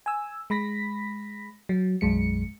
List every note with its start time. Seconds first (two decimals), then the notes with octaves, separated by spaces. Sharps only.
0.06 G#5 E6
0.50 G#3 B5 A#6 B6
1.69 F#3
2.01 B1 F#2 G#3 C#7